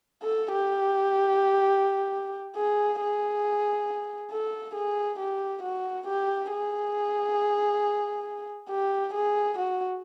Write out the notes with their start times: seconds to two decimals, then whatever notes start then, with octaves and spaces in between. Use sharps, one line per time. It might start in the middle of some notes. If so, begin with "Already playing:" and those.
0.23 A4
0.52 G4
2.56 G#4
3.01 G#4
4.31 A4
4.75 G#4
5.19 G4
5.63 F#4
6.07 G4
6.51 G#4
8.70 G4
9.14 G#4
9.58 F#4